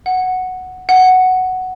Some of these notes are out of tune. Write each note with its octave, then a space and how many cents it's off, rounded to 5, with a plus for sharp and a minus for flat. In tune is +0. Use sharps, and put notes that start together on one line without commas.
F#5 +0
F#5 +5